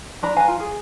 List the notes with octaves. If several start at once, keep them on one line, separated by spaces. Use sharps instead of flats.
D4 A#5 B5
B4 F5 G#5 A#5
F4
G#4